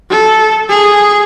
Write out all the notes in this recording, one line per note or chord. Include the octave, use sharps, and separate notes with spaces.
A4
G#4